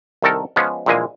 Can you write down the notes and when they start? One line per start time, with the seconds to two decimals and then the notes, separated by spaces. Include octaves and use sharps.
0.22 C2 D#3 A4 A#4
0.56 F3 G#3 B3 C#4
0.86 A#1 A#2 E3 G#3 A#3 G#5